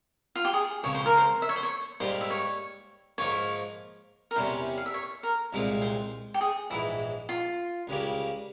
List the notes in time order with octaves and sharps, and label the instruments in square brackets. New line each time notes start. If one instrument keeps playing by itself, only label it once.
[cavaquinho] F4
G4
G#4
[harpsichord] C#2 C#3 F3 C4 [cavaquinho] C#5
[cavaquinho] C5
A#4
C5
E5
C#5
C5
C#5
[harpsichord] G#2 G3 A#3 F4 [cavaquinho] C5
[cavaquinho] E5
C#5
[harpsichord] G#2 F3 A#3 F4 [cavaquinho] C#5
[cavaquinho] A#4
[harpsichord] E2 C3 G3 C#4 [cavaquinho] C5
[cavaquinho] F5
E5
C#5
A#4
[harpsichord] C2 A#2 G#3 C4 F4
[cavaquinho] C5
G4
G#4
[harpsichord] A#1 G#2 E3 [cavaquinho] E4
[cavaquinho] F4
[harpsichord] C#2 C#3 G3 A#3